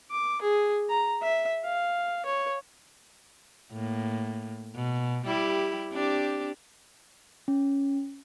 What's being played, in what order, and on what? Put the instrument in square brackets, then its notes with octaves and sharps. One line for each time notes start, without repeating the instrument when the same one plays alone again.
[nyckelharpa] D6
G#4
A#5
E5
F5
C#5
[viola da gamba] A2 A#3
B2
G3 E4 G4
C4 D4 G4
[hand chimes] C#4